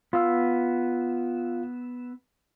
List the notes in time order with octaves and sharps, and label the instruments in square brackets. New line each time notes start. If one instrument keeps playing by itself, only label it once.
[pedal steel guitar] B3 E6 [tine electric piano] F4 F5